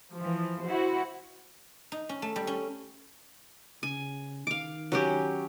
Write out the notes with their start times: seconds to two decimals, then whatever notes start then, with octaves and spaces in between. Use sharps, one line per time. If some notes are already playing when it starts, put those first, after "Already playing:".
0.14 E3 F3
0.64 E4 F#4 C5
1.92 D#4
2.09 C#4
2.22 A3
2.36 G3
2.47 C#4
3.83 C#3 G#5
4.47 D#3 F5 D6
4.92 F#3 C#4 G4